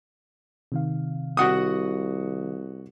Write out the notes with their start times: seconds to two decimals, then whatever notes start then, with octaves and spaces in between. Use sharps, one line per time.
0.72 C3 D#3 F5
1.37 C2 F#4 F#5 D#6